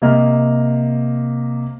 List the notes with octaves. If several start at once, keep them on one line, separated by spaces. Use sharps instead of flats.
C3 A#3 D#5 F6